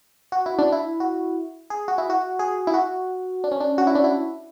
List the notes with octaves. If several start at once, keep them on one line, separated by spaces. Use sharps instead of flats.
F#4
E4
D4
E4
F#4
G#4
F#4
E4
F#4
G#4
E4
F#4
D4
C#4
D4
F#4
E4
D4
E4